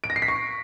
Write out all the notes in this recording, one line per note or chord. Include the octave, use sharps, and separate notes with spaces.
D7
A#6
C7
B6
C#6